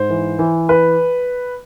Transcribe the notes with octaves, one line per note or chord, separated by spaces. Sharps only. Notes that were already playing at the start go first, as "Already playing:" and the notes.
Already playing: G#2 C5
E3
E3
B4